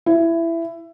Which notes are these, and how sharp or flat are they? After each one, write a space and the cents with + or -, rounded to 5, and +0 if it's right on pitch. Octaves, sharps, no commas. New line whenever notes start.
E4 +15